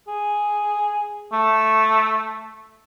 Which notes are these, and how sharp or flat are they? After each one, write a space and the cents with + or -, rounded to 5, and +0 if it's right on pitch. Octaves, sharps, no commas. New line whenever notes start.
G#4 +0
A3 -5